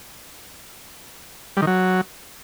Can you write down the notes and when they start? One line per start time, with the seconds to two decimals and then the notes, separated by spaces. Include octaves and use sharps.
1.57 G3
1.62 D#3
1.67 F#3